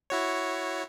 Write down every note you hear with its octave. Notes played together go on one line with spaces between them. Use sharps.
E4 F#4 C#5